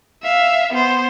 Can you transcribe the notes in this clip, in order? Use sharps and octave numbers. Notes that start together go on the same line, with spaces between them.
E5 F5
B3 C5